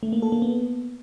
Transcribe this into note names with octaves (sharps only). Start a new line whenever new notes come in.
A3
A#3
A4
A#3
B3